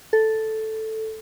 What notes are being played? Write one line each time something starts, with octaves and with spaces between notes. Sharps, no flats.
A4